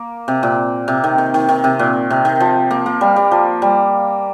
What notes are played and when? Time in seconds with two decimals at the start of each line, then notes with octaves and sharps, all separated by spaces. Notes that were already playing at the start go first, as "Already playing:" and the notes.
Already playing: A#3
0.28 C3
0.43 A#2
0.88 C3
1.04 D#3
1.18 D#3
1.34 D#3
1.49 D#3
1.64 C3
1.79 A#2
2.10 C3
2.25 D#3
2.40 F3
2.71 A#3
2.86 A#3
3.01 G3
3.16 G3
3.31 F3
3.62 G3